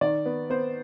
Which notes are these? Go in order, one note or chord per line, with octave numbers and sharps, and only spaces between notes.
D#3 D5
B3
B3 C5